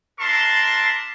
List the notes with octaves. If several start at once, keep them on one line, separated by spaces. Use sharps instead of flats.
D4 A#4 E5 A5 C6